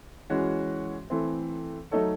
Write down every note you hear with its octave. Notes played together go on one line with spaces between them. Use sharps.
E3 G#3 C#4 F#4
E3 A3 C4
F#3 A3 D#4 A4 C#5